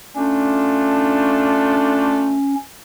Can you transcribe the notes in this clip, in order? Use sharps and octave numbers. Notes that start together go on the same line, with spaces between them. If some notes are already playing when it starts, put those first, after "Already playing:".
A3 C#4 D4 F4